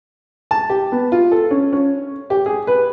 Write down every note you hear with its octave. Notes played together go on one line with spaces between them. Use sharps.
A5
G4
B3
F4
A4
C#4
C#4
G4
G#4
B4